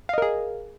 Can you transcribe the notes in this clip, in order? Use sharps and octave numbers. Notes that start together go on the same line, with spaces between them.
G#4 A#4 D#5 F5